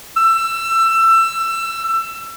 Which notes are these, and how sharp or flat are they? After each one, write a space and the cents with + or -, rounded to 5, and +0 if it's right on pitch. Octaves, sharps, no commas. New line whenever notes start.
E6 +25